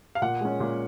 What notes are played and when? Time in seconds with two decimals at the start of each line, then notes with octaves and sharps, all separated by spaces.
0.15 F5
0.22 A#2 F#5
0.41 G#3 C#4
0.60 A#2